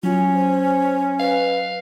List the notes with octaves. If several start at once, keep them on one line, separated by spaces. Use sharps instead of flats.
F#3 C#4 F4
C5
B4 F5